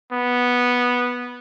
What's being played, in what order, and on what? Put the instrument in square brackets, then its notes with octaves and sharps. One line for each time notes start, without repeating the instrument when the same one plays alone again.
[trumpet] B3